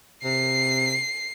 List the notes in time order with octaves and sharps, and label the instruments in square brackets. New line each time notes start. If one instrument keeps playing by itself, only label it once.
[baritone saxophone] C3 [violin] C7